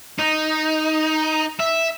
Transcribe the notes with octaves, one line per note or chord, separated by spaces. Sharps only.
D#4
E5